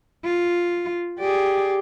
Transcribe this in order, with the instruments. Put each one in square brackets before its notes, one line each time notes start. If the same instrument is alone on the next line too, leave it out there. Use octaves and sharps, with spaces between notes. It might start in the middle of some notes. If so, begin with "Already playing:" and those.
[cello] F4
[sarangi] G4 [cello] G#4 D5